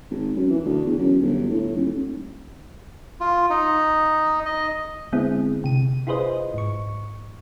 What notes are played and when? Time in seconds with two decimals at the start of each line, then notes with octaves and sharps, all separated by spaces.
0.11 G#1
0.36 F#2
0.50 E3
0.65 D2
0.85 E2
0.99 F#2
1.21 G1
1.50 A2
1.76 D#1
3.20 F4
3.50 D#4
4.45 D#5
5.12 D3 G#3 B3 C4 E4 G#4
5.64 C3 D#7
6.07 E4 F4 G#4 B4 C5 D#5
6.54 G#2 C#6